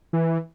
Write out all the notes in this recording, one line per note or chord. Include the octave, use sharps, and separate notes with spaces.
E3